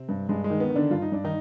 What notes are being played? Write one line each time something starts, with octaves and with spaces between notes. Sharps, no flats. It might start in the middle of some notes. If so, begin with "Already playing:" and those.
Already playing: C3 C4
G2
G2 G#3
G#3
D#3
B3
D#3
D3 D4
G2 F4
D#4
G2 D4
D#3 D#4